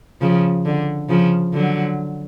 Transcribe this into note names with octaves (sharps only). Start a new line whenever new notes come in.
C#3 F3
D3
C#3 F3
D3 F#3